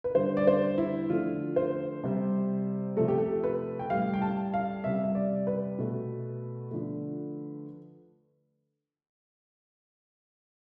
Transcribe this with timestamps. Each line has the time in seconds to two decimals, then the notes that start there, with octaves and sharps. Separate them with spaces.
0.04 B4
0.15 D3 G3 C5
0.37 D5
0.47 C5
0.78 E4
1.10 D3 F3 A3 F4
1.56 C5
2.04 C3 G3
2.97 C3 F3 A3 A4
3.08 G4
3.18 A4
3.44 B4
3.79 G5
3.90 A2 G3 F5
4.14 G5
4.22 A5
4.54 F5
4.84 C3 G3 E5
5.04 E5
5.15 D5
5.47 B4
5.79 B2 A3
6.71 D3 F3 A3